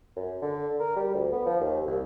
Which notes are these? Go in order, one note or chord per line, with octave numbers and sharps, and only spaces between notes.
F#2
D3
A#4
G3
D2
B3
F3
D#2
C2